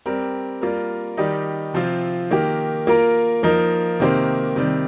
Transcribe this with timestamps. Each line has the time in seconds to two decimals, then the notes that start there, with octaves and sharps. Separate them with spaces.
0.06 G3 C4 G4 A#4
0.61 G3 A#3 F4 A#4
1.17 D#3 G3 D#4 G4
1.74 C3 F3 C4 F4
2.31 D#3 A#3 G4
2.87 A#3 F4 A#4
3.43 F3 A#3 D#4 A#4
4.00 C3 D#3 A#3 G4 C5
4.56 C3 D#3 G3